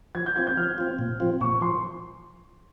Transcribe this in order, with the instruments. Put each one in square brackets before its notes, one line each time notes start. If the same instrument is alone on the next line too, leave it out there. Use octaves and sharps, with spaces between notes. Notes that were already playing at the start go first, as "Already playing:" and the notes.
[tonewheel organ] F3 [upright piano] G#6
[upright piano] G6
[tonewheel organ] C4 F4 [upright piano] G#6
[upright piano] G6
[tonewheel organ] F3 [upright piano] F6
[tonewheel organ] C4 F4
A#2
F3 C4 F4
[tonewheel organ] A#2 [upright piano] C#6
[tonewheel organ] F3 [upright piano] C6